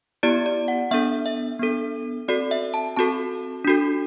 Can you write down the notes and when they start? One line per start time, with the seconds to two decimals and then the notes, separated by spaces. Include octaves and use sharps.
0.23 B3 E4 G4 D5
0.46 D5
0.68 F#5
0.91 B3 D4 A4 E5
1.26 E5
1.60 B3 D4 A4
2.28 C4 F#4 A4 D5
2.51 E5
2.74 A5
2.97 C4 F#4 A4 A5
3.65 D4 F#4 A4